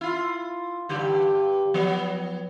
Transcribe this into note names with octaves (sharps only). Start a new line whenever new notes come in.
E4 F4
G2 D3 G4
F3 F#3 B3